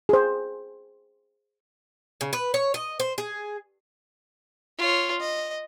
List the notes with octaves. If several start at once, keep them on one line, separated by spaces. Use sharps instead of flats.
G#4 C5
C#3
B4
C#5
D#5
C5
G#4
F4 C#5
D#5